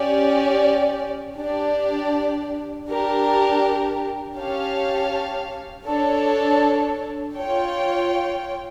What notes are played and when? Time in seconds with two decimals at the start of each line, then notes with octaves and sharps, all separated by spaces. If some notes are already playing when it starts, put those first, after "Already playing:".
Already playing: C#4 G4 D5
1.37 D4 G4 D5
2.87 D4 G4 A#4
4.37 C#4 G4 C#5 F5 A5
5.87 D4 A4 C#5
7.35 F4 C#5 G5